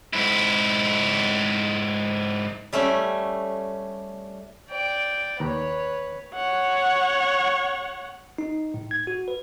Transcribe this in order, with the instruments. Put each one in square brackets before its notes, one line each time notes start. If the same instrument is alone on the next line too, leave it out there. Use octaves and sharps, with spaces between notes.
[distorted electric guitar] G#2 E4
[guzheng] G3 A3 C#4 G5
[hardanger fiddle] D5 G5
[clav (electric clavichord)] D#2 A#5 [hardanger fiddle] B4 C#5
[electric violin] C#5 F#5
[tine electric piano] D#4
A2
G#6
F#4
B4